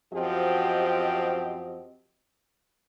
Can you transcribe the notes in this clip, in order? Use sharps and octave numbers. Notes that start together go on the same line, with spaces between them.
F#2 F3 C4 F#4 G4 D#5